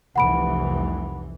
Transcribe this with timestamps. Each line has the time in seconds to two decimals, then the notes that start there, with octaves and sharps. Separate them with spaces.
0.16 F1 C2 E3 F#5 B5 D7